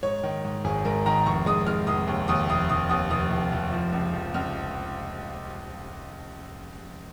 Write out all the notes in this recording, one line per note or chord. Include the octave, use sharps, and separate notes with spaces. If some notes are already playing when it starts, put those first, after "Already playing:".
G#2 C#5
D#3
G#2
G#1 G#4
G#2 A#4
D#3 A#5
F1 C#6
G#3 D#6
G#3 F6
F1 D#6
D#2
D#2 D#6
F1 D#6
F1 D#6
D#2 D#6
F1 D#6
F1
F1
F3
C#2
F3
C#2 F6